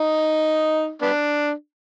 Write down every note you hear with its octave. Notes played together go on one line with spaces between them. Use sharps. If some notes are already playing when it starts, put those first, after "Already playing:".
Already playing: D#4
B3 D4